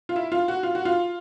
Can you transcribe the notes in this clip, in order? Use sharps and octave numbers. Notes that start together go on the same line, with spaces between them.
F4
E4
F4
F#4
F4
F#4
F4